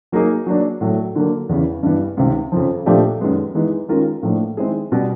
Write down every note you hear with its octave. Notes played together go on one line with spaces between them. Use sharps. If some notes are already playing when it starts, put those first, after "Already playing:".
F#3 A#3 D#4 G#4
F#3 A#3 D4
A2 F#3 A3
D3 F#3 A#3
E2 C#3 E3
G2 E3 G3 B3
C#2 C3 D#3
F2 C#3 F3
A#2 F3 A3 D4 G4
F#2 D#3 G#3 B3
E3 G#3 B3 D#4
D#3 G#3 C#4 F4 A#4
A2 F3 A#3 D4
D#3 G#3 C4 E4 G#4
B2 G3